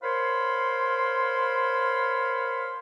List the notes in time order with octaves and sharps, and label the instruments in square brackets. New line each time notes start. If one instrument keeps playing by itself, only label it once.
[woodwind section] A#4 C5 C#5 F5 B5 C6